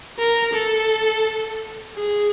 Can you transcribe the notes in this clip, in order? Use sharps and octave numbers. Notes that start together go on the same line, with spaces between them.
A#4
A4
G#4